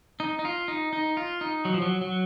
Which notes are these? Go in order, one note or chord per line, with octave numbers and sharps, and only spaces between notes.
D#4
D#4
F4
D#4
D#4
F4
D#4
F#3
F3
F#3
F#3